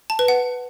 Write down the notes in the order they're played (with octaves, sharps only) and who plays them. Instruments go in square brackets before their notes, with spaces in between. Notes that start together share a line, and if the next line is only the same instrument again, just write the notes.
[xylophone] A5
B4
F#5